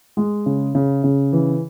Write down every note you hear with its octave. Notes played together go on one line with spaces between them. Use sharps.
G#3
C#3
C#3
C#3
E3